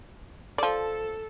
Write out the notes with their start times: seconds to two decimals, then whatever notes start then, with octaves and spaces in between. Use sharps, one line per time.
0.58 F3 A4 D5